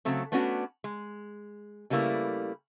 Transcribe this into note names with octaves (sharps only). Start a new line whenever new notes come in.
C#3 F#3 A3 C4
A3 B3 C#4 D4 F4 F#4
G#3
C#3 G3 A3 A#3 E4 B4